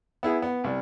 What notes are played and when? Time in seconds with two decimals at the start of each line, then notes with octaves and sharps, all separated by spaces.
0.23 B3 E4 G#4
0.42 B3
0.64 C2 G3